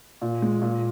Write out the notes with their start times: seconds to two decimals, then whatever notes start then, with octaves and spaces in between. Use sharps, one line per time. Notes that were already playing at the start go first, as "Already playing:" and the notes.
0.21 A#2
0.42 G#3
0.62 A#2